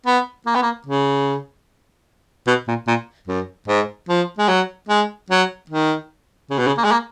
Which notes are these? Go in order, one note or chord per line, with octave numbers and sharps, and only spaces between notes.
B3
A#3
B3
A#3
C#3
B2
A#2
A#2
F#2
G#2
F3
G#3
F#3
G#3
F#3
D#3
C#3
B2
C#3
A#3
G#3
A#3